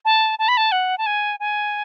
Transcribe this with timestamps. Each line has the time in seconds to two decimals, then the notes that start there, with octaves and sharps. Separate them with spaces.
0.05 A5
0.39 A5
0.48 B5
0.57 A5
0.72 F#5
0.98 A5
1.06 G#5
1.40 G#5